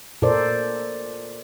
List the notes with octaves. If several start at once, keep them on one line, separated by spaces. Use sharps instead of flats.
A#2 A4 A#4 C5 D5